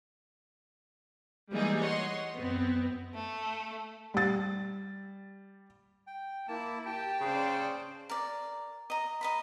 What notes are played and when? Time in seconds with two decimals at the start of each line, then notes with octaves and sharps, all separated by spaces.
1.51 E3 G3 G#3 A#3 D#4 G#4
1.80 C#5 D#5 F#5 C6
2.35 F#2 B3 C4
3.14 A3
4.14 G3 A6
6.07 G5
6.48 A#3 E4 A5
6.86 G4 G5 A5
7.21 C#3 C#4 C5 D5
8.09 A#4 D5
8.90 D#5 A#5
9.21 D#5 A#5 B5